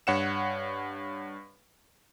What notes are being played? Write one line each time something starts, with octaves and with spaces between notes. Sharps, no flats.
G2 C#5 F#5 C#7 E7